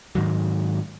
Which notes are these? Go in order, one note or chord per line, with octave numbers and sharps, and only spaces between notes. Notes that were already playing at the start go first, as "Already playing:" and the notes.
G#2 D#3 F#3